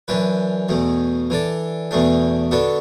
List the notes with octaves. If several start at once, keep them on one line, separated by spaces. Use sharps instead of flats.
F#2 E3 D4 B4
E2 B2 A3
E3 D4 A4 D5
E2 B2 A3 D4
D3 B3 D4 F#4 A4